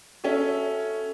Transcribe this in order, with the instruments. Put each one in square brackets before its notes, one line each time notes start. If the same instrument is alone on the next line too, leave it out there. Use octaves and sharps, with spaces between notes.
[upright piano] C#4 [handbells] F#4 A4 E5